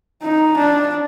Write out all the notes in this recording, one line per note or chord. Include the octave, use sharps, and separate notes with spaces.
D#4
D4